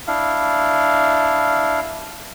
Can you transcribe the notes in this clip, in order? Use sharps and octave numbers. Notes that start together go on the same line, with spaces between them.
D4 E4 F5